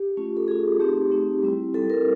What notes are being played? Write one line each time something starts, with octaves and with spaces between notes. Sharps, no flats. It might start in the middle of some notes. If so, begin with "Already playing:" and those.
Already playing: G4
A3 C#4 F4
A4
A3 C#4 F4 G#4
A3 C4 D#4 G4
A3 C4 D#4
G3 C4 E4
G3 C4 E4 A4
A#4